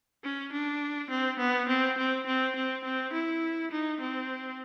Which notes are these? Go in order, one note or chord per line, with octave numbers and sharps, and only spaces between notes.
C#4
D4
C4
B3
C4
C4
C4
C4
C4
E4
D#4
C4